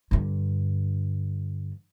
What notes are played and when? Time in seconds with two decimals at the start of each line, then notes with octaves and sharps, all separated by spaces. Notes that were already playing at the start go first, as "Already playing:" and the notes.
0.11 G2 D3